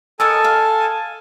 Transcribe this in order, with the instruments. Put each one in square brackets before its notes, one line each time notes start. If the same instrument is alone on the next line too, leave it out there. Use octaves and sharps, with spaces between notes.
[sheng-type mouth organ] A4 G#5 A5 [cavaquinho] A#4 C#5 D#5 [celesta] E6 A6
[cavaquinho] F5